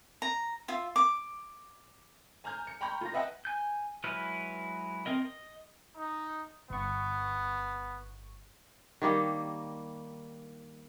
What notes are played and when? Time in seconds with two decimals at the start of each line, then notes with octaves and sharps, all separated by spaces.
0.22 A#5
0.68 F4 E5
0.96 D6
2.44 G#5 A#5 F6 G6
2.67 C#7
2.81 G5 A#5 B5 C#6 G6
3.01 F4 A#5 A#6
3.13 B4 D#5 E5 F#5 G5 A5
3.45 G#5 G6
4.04 F#3 G#3 E4 B4 F6
5.06 C4 A#4 D#5
5.22 D#5
5.96 D#4
6.70 G1 B3 C#6
9.02 D#3 G3 A#3